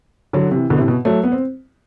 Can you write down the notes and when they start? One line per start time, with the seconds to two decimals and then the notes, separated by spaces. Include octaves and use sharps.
0.33 D3 F#3
0.51 C3 E3
0.70 B2 D3
0.78 A2 C3
0.88 B2
1.05 F#3 A3
1.23 B3
1.32 C4